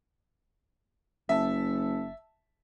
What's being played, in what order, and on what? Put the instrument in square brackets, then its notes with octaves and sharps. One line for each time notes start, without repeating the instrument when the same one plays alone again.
[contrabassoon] F#1 [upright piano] E5 A5